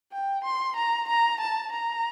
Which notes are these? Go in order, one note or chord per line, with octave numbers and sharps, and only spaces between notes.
G5
C6
A#5
A#5
A5
A#5